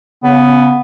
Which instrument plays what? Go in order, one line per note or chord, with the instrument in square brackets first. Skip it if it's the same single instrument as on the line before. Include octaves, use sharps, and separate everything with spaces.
[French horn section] C#3 [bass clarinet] B3